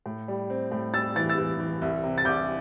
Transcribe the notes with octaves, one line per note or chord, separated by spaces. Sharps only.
A2
G3
C4
A2
G3 E6 A6
E3 A6
E6 A6
E3
E3
C2
C3
A6
C2 D6 G6